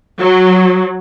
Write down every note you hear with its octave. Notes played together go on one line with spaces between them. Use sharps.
F#3